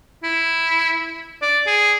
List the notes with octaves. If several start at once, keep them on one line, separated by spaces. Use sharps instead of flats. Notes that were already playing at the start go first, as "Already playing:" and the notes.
E4
D5
G#4